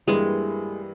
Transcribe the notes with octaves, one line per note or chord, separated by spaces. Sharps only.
G2 E3 G3 G#3 A#3